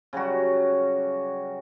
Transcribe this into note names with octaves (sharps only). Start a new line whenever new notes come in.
C#3 F#3 G3 F#4